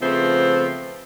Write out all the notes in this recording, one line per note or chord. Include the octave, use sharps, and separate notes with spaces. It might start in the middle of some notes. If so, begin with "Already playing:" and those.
C#3 F3 A3 B3 C4